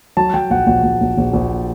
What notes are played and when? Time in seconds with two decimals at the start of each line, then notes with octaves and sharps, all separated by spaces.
0.17 F#3 A5
0.34 F#3 G5
0.50 A#1 F#5
0.67 A#1 F#5
0.83 A#1
1.01 A#1
1.18 A#1
1.33 A#1